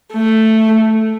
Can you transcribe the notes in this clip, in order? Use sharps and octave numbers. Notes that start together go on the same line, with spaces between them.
A3